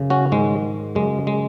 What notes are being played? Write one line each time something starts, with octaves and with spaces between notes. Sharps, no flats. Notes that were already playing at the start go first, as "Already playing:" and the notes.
Already playing: F#2 C#3
C#4 F#4
G#2 D#3 G#3
F#2 C#3 G#3
G#3